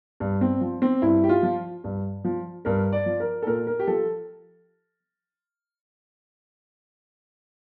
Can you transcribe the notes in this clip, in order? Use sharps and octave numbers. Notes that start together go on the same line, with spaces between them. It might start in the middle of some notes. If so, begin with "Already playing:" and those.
G2
C4
F3
C4
G2 E4
G4
F4
F3
G2
F3
G2 A#4
D5
F3
A#4
A4
A#2 A#4
A#4
G4
F3 A4